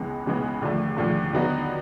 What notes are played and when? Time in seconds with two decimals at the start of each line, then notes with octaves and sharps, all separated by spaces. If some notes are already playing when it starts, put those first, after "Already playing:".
Already playing: C#2 C#3 E3 G#3 B3
0.26 C#2 C#3 E3 G#3 B3
0.62 D#2 D3 F3 A3
0.97 D#2 D3 F3 A3
1.33 D#2 D3 F#3 B3 D#4